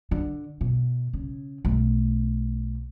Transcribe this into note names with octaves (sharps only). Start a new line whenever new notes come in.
D3
B2
C#3
B1 A3